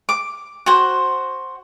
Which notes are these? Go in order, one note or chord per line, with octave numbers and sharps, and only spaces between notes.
D6
F#4 C5